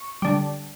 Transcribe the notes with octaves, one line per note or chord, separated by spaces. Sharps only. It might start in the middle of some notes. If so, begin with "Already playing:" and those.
Already playing: C#6
D3 G3